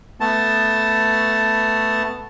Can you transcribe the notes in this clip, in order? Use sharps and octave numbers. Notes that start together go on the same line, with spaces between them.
A3 B3 A5